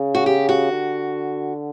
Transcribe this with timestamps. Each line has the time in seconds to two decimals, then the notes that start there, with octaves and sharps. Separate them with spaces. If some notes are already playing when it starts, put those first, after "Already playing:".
Already playing: C#3
0.15 F#4
0.26 G4
0.49 F#4
0.72 D3